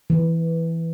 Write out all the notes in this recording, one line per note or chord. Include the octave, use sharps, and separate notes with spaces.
E3